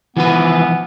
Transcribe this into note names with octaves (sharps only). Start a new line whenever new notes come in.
E3 F3 B3 B4